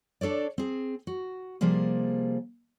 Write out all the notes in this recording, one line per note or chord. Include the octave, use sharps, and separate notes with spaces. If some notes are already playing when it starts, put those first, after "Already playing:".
D4 A4 C#5 D5
C4 G#4
F#4
C3 F3 G3 A#3 G#4